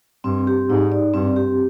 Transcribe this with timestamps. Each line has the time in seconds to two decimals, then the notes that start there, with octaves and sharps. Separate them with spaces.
0.24 G2 C4
0.47 G4
0.70 G#2 D#4
0.92 D5
1.14 G2 C4
1.36 G4